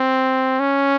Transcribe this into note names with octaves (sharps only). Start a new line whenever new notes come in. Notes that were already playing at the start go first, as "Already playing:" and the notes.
Already playing: C4
C#4